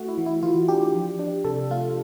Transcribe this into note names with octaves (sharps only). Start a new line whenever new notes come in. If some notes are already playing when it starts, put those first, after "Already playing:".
Already playing: A3 F#4
E4
E3
E4
E3 F4
D4 G4
F3
D4
C3 A4
A3 F4